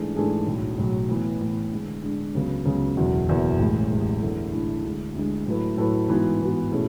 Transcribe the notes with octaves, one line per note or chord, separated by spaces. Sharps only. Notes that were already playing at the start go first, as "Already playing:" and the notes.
Already playing: G#2 E3 A3 D4 G#4
G#2 E3 A3 D4 G#4
B1 A2 F#3
B1 A2 F#3
A2 E3 B3
A2 E3 B3
D3 G#3 D4
D3 G#3 D4
C#2 C#3 F#3 B3
C#2 C#3 F#3 B3
F#1 E2 B2 F#3
F#1 E2 B2 F#3
A1 A2 G#3
A1 A2 G#3
E2 D3 A3 E4 A4
E2 D3 A3 E4 A4
D2 D3 G#3
D2 D3 G#3
A2 F#3 A3 E4 B4
A2 F#3 A3 E4 B4
G#2 E3 B3 F#4
G#2 E3 B3 F#4
B2 A3 C#4 E4 G#4